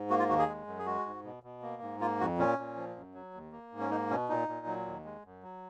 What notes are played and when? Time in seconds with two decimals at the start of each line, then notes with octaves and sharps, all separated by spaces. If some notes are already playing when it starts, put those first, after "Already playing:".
Already playing: G#2
0.10 A#3 F#4
0.19 F4
0.29 D#2 F#4
0.39 G#4
0.48 G#3
0.67 F#2
0.79 G#4
0.86 G#3 F#4
1.06 G#2
1.24 B2
1.43 B2
1.62 A#3
1.82 G#2
2.00 A#3 F4
2.20 F2 F#4
2.38 A#2 C#4
2.58 A#2
2.76 F3
2.96 F#2
3.14 F#3
3.34 D#2
3.52 A#3
3.72 G#2
3.80 C#4
3.90 A#3 D#4
4.10 B2 C#4
4.29 A#2 D#4
4.48 A#2
4.66 F#3
4.86 D#2
5.05 G#3
5.25 F#2
5.43 F#3